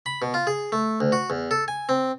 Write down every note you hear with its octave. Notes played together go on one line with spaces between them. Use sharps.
B5
B2
F4
G#4
A3
D2
F#4
E2
A4
G#5
C4